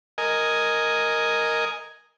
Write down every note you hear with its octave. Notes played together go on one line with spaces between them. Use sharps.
A#4 D#5 G#5